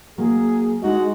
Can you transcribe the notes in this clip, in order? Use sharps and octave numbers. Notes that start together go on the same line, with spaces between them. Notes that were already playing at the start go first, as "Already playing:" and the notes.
F#3 A#3 G#4
G#3 D#4 F#4 D#5